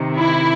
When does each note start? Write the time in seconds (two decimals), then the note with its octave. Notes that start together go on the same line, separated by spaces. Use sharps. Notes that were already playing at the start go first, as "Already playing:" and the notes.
Already playing: C3 D#3
0.19 E4